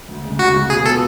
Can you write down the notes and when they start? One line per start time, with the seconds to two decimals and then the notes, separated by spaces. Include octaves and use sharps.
0.08 D2
0.23 C#3 G#3
0.39 D2 F#4
0.54 C#3 G#3
0.70 B2 G#4
0.85 F#3 B3 F4 A4